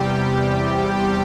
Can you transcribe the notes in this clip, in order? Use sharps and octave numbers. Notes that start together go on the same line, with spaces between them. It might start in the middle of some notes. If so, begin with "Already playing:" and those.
Already playing: E2 C3 G3 G4
G4